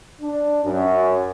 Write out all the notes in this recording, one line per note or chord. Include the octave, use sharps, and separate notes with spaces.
D4
F#2